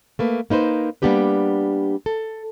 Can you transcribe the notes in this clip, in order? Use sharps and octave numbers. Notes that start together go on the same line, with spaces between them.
A3 A#3 B4
A#3 D#4 B4 C5
G3 A#3 B3 D4 G4 B4
A4